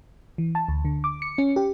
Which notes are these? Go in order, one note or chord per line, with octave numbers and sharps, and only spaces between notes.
E3
A5
D2
D3
D6
C#7
C#4
G4